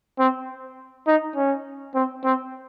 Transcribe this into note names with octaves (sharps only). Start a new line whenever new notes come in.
C4
D#4
C#4
C4
C4